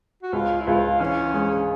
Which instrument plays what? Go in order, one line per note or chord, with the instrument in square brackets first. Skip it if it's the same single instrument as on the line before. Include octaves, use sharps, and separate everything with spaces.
[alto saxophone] F#4
[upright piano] C#2 [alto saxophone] F4
[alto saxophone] E4
[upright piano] C#2 [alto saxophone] F4
[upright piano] E3 [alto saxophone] C#4
[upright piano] G#3